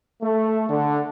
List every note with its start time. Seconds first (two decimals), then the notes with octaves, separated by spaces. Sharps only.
0.22 A3
0.69 D3